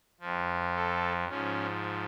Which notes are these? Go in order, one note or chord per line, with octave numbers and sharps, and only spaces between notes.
F2 F3
A4
G#2 F3 C#4